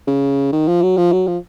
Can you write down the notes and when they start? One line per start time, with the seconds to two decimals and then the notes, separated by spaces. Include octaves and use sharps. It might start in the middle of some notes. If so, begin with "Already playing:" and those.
0.07 C#3
0.53 D#3
0.68 F3
0.82 F#3
0.97 F3
1.13 F#3
1.27 F3